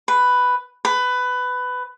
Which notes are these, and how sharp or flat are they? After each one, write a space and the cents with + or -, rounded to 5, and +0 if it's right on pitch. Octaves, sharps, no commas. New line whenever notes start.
B4 +5
B4 +15